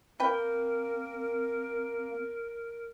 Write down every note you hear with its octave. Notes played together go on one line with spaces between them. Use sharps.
A#3 C4 A#4 B4 G5